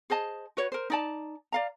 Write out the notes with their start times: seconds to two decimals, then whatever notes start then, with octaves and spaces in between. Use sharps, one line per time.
0.10 G#4 C5 D#5 A5
0.57 F#4 B4 C#5
0.72 A#4 C5
0.90 D#4 D5 A5
1.52 D5 F5 A#5